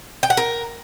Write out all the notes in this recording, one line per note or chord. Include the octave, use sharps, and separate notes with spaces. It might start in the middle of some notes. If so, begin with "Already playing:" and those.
G5
F#5
A#4